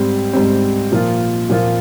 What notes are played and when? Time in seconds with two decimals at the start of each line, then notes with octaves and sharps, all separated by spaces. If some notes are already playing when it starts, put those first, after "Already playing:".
Already playing: G#2 G3 C4
0.33 G#2 G3 C4
0.92 A#2 F3 A#3 F4
1.49 A#2 F3 A#3 F4